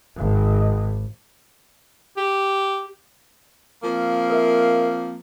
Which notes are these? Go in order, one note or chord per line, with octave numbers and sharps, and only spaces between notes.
G#1
G4
F3 A#3 C4
A#4 E5